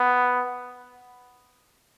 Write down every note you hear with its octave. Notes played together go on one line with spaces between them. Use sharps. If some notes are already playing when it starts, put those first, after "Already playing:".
Already playing: B3